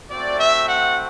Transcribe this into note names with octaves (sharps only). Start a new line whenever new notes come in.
A3 C4 F#4 D5
E5
F#5